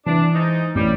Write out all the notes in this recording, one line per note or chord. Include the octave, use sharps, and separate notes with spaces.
E3 D4
G#2 D#4
A1 G3